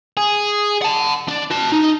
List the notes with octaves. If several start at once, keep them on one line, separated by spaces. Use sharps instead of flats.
G#4
F#5 A5
D4
F#4 A5
D#4